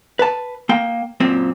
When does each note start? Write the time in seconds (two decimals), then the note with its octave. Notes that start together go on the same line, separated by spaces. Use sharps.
0.19 B4 A5
0.69 A#3 G5
1.20 F#2 A#2 C4